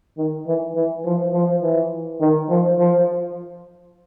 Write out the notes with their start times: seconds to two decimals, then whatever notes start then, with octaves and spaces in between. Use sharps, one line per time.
0.18 D#3
0.47 E3
0.75 E3
1.05 F3
1.34 F3
1.62 E3
2.21 D#3
2.50 F3
2.79 F3